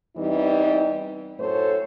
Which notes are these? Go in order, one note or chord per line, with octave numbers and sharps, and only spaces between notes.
E2 E3 G3 C4 D#4 D#5
F#2 A2 A4 C5 C#5